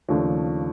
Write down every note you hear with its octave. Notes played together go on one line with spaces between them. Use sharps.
D#2 C#3 F3 A3 D4